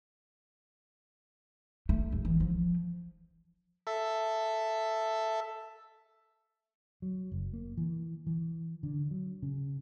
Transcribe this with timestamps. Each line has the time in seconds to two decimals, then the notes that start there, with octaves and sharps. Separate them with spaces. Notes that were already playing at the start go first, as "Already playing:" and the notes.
1.89 A3
2.12 D1
2.25 E3
2.40 F3
3.87 A4 E5
7.02 F#3
7.32 F#1
7.53 A#3
7.78 E3
8.27 E3
8.83 D3
9.11 F#3
9.42 C#3